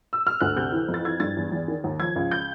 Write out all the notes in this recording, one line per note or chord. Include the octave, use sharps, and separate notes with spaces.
E6
F6
D2 F#6
C3 G6
E3
F2
A6
E3 G#6
G2 A6
E2
E2
D#3
D#2
F3 G#6
C#2
G6